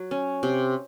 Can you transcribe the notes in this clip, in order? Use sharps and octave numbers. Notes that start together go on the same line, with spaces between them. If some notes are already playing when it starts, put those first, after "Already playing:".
Already playing: F#3
C#4
C3